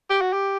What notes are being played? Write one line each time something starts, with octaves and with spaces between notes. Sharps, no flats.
G4
F#4
G4